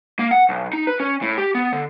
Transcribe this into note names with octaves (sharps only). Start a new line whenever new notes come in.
A#3
F#5
B1
D#4
B4
C#4
A2
G4
B3
D3